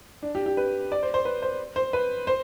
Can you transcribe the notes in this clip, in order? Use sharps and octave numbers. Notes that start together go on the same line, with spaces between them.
D4
G4
G4
B4
D5
C5
C5
B4
C5
C5
B4
C5